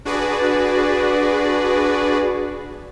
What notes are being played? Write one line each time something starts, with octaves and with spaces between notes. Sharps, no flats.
D4 F#4 G#4 B4 D5